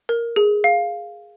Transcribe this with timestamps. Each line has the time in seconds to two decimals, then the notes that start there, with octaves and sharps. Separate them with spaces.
0.09 A#4
0.36 G#4
0.64 F5